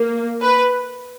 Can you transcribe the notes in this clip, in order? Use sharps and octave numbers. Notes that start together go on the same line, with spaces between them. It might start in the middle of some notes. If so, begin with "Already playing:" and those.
Already playing: A#3
B4